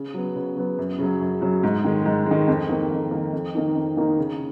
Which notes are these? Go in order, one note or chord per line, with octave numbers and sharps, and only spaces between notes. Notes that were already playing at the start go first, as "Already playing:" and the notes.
Already playing: C#3
F#3 B3
C#3
F#3 B3
F#2
C#3 F#3
F#2
C#3 F#3
G#2
D#3 G#3
G#2
D#3 G#3
F2
D#3 A#3
F2
D#3 A#3
F2
D#3 A#3 D#4
F2
D#3 A#3 D#4
C#3